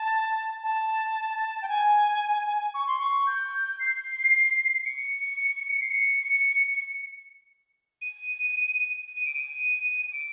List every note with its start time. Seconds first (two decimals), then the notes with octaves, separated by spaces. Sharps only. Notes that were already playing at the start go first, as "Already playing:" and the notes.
Already playing: A5
0.63 A5
1.62 G5
1.68 G#5
2.74 C#6
2.87 C6
2.99 C#6
3.27 G6
3.80 C7
4.85 C#7
5.81 C7
5.90 C#7
8.01 D#7
9.16 D#7
9.25 D7
9.34 D#7
10.13 D7